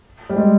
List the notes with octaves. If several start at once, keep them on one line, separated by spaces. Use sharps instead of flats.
G3
G#3